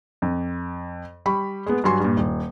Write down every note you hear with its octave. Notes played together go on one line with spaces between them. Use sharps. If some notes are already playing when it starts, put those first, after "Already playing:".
F2
G3 B5 C#6
G#3 B3
G2 F#3 G#5 C6 C#6
G2 A#2
D#1